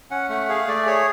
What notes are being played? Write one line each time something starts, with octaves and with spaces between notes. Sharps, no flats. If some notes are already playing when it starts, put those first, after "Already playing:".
C#4 F#5
A3 F#5
G#4 F5
A3 D5
G#4 C#5